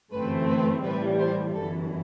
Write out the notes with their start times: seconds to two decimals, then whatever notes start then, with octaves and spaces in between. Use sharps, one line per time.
0.12 G1 F#2 E3 A3 C4 B4
0.48 B4
0.83 A2 E3 G3 B4
1.19 C5
1.54 G1 F#2 E3 A4